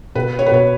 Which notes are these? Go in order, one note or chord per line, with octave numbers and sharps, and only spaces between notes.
B2 B4
C#5
B4
B2 C#5